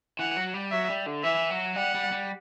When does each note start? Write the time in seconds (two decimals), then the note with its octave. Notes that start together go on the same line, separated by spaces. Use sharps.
0.19 E3 F#5
0.36 F#3
0.54 G3
0.72 F#3 E5
0.90 G3
1.06 D3
1.24 E3 E5
1.50 F#3
1.76 G3 F#5
1.94 G3
2.12 G3